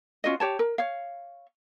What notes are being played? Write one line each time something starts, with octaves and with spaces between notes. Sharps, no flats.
C#4 F4 F#4 D#5
G4 C#5 A5
A#4
C#5 F5